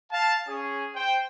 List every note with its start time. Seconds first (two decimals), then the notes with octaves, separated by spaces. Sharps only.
0.12 F5 A5
0.48 C#4 G#4
0.95 C5 G5